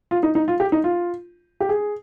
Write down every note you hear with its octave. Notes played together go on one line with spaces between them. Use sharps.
F4
D#4
D#4
F4
G4
D#4
F4
G4
G#4